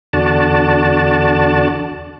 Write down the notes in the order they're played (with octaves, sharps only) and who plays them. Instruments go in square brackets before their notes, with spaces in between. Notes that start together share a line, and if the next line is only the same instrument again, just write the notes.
[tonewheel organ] E2 D3 D4 F#4 D5 A5